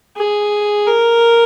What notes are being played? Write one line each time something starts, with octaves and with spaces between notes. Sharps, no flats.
G#4
A#4